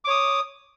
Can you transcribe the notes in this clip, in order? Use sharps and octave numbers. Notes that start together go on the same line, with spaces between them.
C#5 D6 D#6